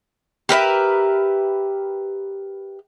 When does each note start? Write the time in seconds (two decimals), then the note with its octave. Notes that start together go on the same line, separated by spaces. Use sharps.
0.49 G4 A#4 B4 E5